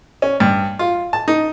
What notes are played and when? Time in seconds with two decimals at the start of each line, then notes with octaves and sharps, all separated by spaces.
0.22 C#4
0.40 G2
0.79 F4
1.13 A5
1.28 D#4